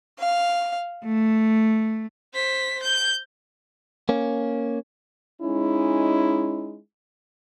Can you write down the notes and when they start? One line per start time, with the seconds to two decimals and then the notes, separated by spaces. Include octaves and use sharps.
0.20 F5
1.03 A3
2.34 C5 B6
2.83 G6
4.09 A#3 C#4
5.42 G#3 C#4 D#4 E4